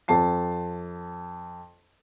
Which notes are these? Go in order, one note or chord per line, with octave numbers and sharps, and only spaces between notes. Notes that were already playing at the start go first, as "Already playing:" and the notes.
F2 A5 C7